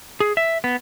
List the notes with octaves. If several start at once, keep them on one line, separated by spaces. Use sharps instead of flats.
G#4
E5
B3